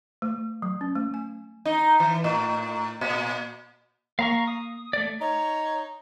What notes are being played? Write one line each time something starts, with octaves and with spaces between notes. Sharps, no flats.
A3
F#3
C#4
A3
G#5
D#4
E3
A2
A#2
A#3 F5 A#5 C#6
D#6
A3 D5
D#4 C#5